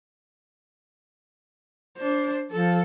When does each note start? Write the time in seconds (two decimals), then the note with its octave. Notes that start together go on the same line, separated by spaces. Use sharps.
1.98 D4 C5
2.51 F3 A4